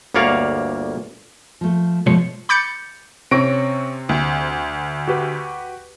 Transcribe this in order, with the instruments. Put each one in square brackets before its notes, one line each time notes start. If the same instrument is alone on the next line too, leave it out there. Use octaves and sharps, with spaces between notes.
[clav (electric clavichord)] G1 D2 A#3 C#5 D5 F5
[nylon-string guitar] F3 A3
[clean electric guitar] B2 G#3 C#5 [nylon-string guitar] F3 A3
[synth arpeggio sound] B5 D6 G6 A6 C#7
[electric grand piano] C3 C4 A#6 [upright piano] C#4 C#6 D7
[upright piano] D2
[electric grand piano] F#4 G4 B4